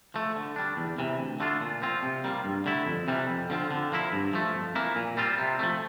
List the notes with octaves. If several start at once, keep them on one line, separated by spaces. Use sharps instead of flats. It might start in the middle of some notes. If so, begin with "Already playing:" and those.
F3 A3
D3
G3 D4
E2
C3 E3
D2
D3 A3 D4 F4
A#2
F3 C4 F4
C3
G3 A#3 F4
G2
D3 A3 E4
F2
C3 E3 G3
F2
D3 F3 C4 F4
D3
F3 A#3 E4
G2
F3 A3
F2
E3 A#3 E4
A#2
G3 C4 F4
C3
F3 A3